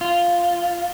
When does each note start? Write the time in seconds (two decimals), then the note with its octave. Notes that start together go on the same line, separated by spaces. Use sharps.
0.01 F4